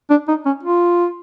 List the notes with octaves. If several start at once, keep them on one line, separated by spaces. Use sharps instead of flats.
D4
D#4
C#4
F4